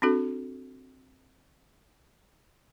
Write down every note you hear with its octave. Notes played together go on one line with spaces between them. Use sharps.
C4 D4 F#4 A4